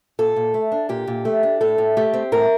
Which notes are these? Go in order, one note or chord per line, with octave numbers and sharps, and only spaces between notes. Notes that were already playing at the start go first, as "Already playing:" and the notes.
A#2 A4
A#2
A3
D4
A#2 G4
A#2
A3
D4
A2 A4
A2
A3 G4
C4
A2 A#4